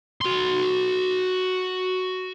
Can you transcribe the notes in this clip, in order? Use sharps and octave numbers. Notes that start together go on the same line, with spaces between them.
F#4 C6